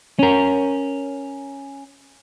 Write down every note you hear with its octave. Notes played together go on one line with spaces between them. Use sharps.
C#4 A#4